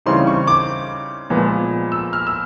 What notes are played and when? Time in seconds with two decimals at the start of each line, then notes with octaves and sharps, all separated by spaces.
0.06 C#3 E3 G3 C4 D#4 C6
0.27 C#6
0.47 D6
1.30 A#2 F3 G#3 B3
1.92 E6
2.13 F6
2.27 E6